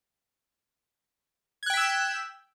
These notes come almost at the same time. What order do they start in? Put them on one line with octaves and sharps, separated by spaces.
G#6 F#6 G5 B6 E6